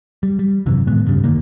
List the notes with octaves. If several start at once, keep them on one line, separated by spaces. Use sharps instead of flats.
G3
G3
G#1 F#2 C3 E3
A2 D#3 G#3 B3
D2 G2 C#3 G3
F1 D3 D#3 A#3